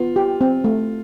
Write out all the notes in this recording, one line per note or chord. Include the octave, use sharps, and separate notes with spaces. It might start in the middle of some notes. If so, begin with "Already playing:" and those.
Already playing: B3 F4
G4
C4
A3